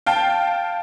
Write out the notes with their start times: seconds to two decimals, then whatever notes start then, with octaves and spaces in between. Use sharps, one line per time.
0.06 F5 G5 A5